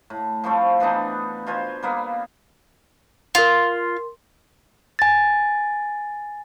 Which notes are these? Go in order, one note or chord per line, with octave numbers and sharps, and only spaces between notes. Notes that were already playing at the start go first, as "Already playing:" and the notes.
A2
F3 G3 A3 C4
E3 B3 D4 D#4
B2 F4 C5 G#5
G3 A#3 B3
F4 A#4 C6
G#5 A6